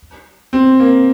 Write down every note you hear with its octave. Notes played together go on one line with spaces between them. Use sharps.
C4
A#3